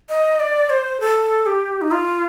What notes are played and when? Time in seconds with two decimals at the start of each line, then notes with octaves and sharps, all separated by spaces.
0.09 D#5
0.40 D5
0.70 C5
1.00 A4
1.46 G4
1.81 D#4
1.92 F4